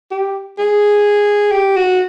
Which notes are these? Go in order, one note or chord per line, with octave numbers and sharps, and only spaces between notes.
G4
G#4
G4
F#4